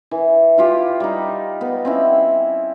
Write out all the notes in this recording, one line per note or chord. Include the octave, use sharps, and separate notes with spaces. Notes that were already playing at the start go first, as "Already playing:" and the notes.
E3
E4 F4 G4
G3 D#4
B3
C4 C#4 E4